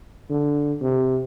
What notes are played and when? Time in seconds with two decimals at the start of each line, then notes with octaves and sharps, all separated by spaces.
0.30 D3
0.81 C3